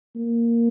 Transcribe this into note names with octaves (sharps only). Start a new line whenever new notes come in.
A#3